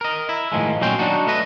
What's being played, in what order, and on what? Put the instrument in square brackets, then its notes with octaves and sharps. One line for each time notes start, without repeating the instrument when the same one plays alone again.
[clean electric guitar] A#4 D#5
E4
A2 D#3 F3 G#3
B1 A#2 F#3 C#4 C5 G5
F#3 D4 D#4 F#4
A3 B4 D#5